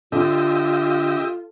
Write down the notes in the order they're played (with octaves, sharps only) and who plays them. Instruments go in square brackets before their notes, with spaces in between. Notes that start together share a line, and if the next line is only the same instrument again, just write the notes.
[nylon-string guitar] D3 [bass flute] F4 [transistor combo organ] G4 D#5 E5